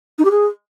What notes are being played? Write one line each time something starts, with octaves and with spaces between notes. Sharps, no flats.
D#4
G4
G#4